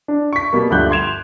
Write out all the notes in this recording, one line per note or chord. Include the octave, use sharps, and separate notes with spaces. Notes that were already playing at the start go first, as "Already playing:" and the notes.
D4
C#6 B6
B2 G3 A#3
D2 G2 F3 F#5 F#6 G6
C6 G#6 E7 F7